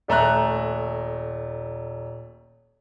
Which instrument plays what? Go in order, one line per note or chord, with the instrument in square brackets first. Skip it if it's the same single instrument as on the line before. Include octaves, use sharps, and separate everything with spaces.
[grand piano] D#1 A3 A#5 F#6